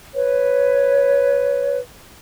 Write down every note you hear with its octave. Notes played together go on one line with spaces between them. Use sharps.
B4 C#5